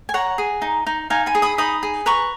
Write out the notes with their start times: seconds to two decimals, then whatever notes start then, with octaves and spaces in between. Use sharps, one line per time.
0.09 G#5
0.14 C#5 F#5 A#5
0.38 G#4
0.62 D#4
0.87 D#4
1.10 D#4 F5 G#5
1.26 G#5 B5
1.35 G#4
1.42 B5 D#6
1.58 D#4 B5 D#6
1.83 G#4
2.06 B4 A#5 C#6